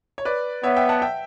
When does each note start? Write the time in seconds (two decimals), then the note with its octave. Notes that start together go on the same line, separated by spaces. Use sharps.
0.18 C#5
0.25 B4 D5
0.63 B3 C#5 E5
0.77 E5 G5
0.89 F#5 A5
1.02 E5 G5